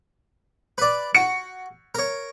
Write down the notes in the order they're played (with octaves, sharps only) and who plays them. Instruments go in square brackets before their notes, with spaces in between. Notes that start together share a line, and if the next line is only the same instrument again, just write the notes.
[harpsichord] B4 D5
[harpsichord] F#4 [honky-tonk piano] C#7
[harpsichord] A#4 C#5